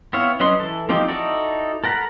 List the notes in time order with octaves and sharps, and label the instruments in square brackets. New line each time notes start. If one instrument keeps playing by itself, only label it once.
[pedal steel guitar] B3 C4 E4 C#5 F5
F#3 C#4 B4 D#5 C6
E3 A4
F3 A#3 C4 D#4 G4
D#4 E4 F#4 A4 D5
A4 A#4 F#5 A#5 B5